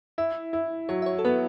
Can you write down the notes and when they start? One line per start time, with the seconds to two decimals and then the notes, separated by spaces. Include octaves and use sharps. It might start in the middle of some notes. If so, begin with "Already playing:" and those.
0.18 E4 E5
0.53 E4
0.89 F#3 C#5
1.02 E5
1.06 C#5
1.19 A4
1.25 B3 B4